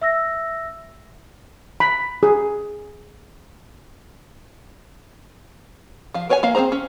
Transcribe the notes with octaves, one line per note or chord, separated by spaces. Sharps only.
E5 E6 A#6
B5
G#4
F3 F5
A#4 B4 C#5 F#5 G#5
A#3 E5 F5
C4 C#4 G#4 C5 A#5
C#4